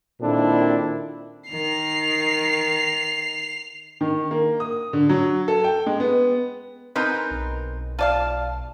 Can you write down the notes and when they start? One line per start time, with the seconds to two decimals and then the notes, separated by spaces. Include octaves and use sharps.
0.20 A#2 D#3 C4 D4 E4 A4
1.49 D#3 C7 F7
4.01 D#3
4.31 A#3
4.60 D#6
4.93 D3
5.09 F#3
5.48 A4
5.64 G5
5.86 G#3
6.00 B3
6.96 G#3 C4 D#4 A#4 B4
7.31 B1
7.99 F4 D5 F5 A5